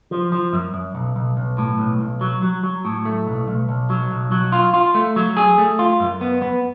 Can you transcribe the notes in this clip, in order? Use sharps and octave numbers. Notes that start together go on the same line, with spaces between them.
F3
F3
F#2
F#2
B1
B1
B1
A2
B1
B1
F#3
F#3
F#3
A2
A3
B1
B1
B1
F#3
B1
F#3
F4
F4
A3
F#3
G#4
A3
F4
F#2
B3
B3